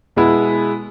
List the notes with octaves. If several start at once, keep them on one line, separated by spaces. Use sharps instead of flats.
B2 G#3 B3 E4